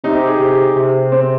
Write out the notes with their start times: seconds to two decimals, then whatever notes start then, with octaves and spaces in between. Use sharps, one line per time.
0.04 C3 D#4
0.15 G4
0.27 G#4
0.40 C3
0.76 C3
1.12 C4